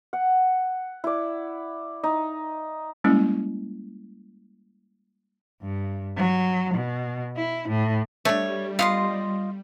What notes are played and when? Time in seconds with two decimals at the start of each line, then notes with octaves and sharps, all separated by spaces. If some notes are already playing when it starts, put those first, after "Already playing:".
0.13 F#5
1.04 E4 D5
2.04 D#4
3.04 G3 G#3 A#3 C#4 E4
5.62 G2
6.17 F#3
6.74 B2
7.36 E4
7.69 A2
8.25 G3 A3 D4 C#5
8.79 B3 F4 D#5 F5 C6